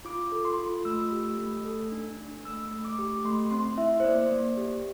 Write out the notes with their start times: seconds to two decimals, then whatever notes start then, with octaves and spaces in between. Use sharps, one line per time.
0.05 F4 D6
0.32 A4
0.45 C6
0.59 F4
0.85 A3 E6
1.12 G4
1.38 A3
1.65 A4
1.92 D4
2.18 D4
2.45 A3 E6
2.71 A3
2.85 D6
2.99 G4
3.24 A3 C6
3.51 C4 C6
3.77 E4 E5
4.00 C5
4.04 A#3 D5
4.32 A#3
4.57 G4